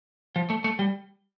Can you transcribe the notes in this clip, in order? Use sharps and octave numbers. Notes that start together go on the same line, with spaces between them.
F3
A3
A3
G3